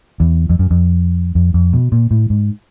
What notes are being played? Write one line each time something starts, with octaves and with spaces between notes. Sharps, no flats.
E2
F2
F#2
F2
F2
F2
B2
A#2
A2
G#2